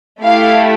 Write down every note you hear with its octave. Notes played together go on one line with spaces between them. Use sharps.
A3 E4 G4 F5